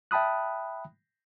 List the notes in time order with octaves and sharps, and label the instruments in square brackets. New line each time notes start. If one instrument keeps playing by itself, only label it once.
[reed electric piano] E5 G5 A5 B5 D#6 F#6